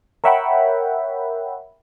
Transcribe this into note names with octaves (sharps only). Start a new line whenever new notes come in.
A#4 C#5 E5 F#5 G5 B5